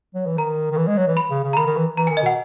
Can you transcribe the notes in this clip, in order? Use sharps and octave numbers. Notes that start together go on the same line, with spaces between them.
F#3
E3
D#3 A#5
D#3
E3
G#3
F#3
E3
B5
C#3
C#3
A#5
D#3 B5
D#3
E3
E3 A#5
G#5
D#3
D#5
B2 F#5